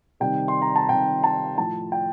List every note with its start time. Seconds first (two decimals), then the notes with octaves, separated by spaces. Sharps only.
0.20 C3 D#3 G3 G5
0.48 C6
0.62 A#5
0.76 A5
0.89 C3 D#3 G3 G5
1.24 A5
1.58 A2 F3 A5
1.92 G5